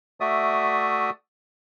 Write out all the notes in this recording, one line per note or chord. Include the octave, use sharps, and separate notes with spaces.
A3 F#4 D5 E5 D#6